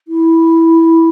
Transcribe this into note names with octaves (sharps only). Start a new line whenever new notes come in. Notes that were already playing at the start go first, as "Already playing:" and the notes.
E4